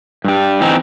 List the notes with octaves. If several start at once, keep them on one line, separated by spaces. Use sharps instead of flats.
G2 G3
E3 C4 D#4